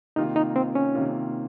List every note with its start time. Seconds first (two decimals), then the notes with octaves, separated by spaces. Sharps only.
0.16 C3 D#3 A#3 D#4 F4
0.36 D#4
0.56 C4
0.75 C#4
0.95 C3 D#3 A#3 F4